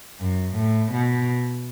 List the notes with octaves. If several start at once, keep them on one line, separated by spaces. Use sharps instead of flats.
F#2
A2
B2